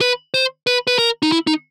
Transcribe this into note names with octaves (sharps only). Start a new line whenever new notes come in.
B4
C5
B4
B4
A#4
D#4
E4
D#4